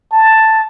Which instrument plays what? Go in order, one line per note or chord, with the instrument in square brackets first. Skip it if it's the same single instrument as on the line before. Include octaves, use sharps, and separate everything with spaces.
[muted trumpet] A5